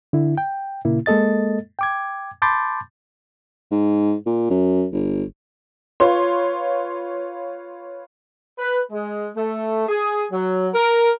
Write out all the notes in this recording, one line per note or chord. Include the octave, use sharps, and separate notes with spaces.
D3 E4
G5
A#2 C#3 A#3 E4
G#3 A#3 A4 D#5 A6
G5 D6 G#6
A5 B5 C6 D6 G6 A6
G#2
A#2
F#2
G1
F4 B4 C#5 C6
B4
G#3
A3
G#4
F#3
A#4